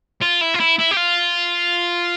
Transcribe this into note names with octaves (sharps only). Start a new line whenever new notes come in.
F4
E4
F4
E4
E4
G4
F4